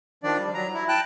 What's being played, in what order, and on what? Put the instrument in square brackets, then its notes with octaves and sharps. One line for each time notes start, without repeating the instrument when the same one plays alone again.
[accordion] D#3 F3 D4 D5
G3
F#3 A#5
E4
G5 A5 F#6